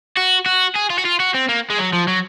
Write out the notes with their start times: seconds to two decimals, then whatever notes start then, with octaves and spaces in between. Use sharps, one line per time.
0.17 F#4
0.46 F#4
0.75 G#4
0.90 F4
0.98 F#4
1.05 F4
1.20 F#4
1.34 C4
1.49 A#3
1.70 G#3
1.79 F#3
1.93 F3
2.08 F#3